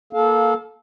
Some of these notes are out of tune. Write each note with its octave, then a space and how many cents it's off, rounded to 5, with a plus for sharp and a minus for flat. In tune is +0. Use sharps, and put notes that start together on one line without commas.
A#3 +0 A4 -20 F5 +10